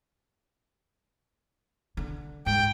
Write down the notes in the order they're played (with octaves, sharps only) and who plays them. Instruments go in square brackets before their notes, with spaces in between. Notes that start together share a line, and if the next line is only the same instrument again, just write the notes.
[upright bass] D3
[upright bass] G#2 [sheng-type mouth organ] G5